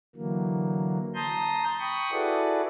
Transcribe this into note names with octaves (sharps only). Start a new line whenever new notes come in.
D3 E3 F#3 A#3
A5 A#5 C6 D#6 G6
G5 B5 C#6 D#6
E4 F#4 G#4 A4 B4 D5